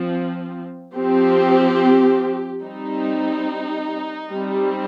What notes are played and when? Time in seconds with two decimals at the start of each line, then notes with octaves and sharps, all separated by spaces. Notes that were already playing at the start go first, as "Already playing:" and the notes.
Already playing: F3 C4
0.95 F3 C4 G4
2.62 G3 C4 D#4
4.31 G3 C4